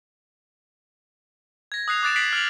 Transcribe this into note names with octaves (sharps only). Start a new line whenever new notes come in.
G#6 A#6
D#6 F#6 C7 F7
D6 F#6 A6 D7 E7
B6 C7 D7 F#7
F6 D7 F7 F#7